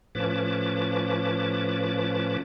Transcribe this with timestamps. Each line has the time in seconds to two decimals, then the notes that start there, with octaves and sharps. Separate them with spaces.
0.15 A2 F3 C#4 B4 A5 D6